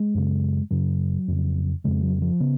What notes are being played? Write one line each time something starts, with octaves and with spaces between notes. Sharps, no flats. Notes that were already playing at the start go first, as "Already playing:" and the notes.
Already playing: G#3
F#2 C#3
F#2 C#3 F#3
F2 C#3
F2 C#3 G#3
F#3
F3
C#3 B3